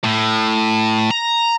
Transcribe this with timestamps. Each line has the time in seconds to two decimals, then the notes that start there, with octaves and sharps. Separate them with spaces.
0.04 A2
1.11 A#5